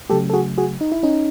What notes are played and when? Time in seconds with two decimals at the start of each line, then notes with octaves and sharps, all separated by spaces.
0.10 C#3 F#3 A3 G4 A4
0.30 A4
0.33 F#4 G#4
0.58 F#4 G#4
0.81 D#4
0.92 E4
1.03 C#4 D#4